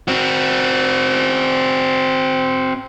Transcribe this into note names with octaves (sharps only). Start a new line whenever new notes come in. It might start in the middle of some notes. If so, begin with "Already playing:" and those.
C4 F#4